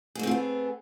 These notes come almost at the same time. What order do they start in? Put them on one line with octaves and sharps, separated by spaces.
G#4 A3 C4 F4 B3